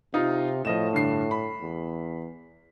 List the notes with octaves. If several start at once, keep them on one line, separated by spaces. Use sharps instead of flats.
C3 D#4 F4
A2 F3 D#5 E7
G2 D3 C7
B5
E2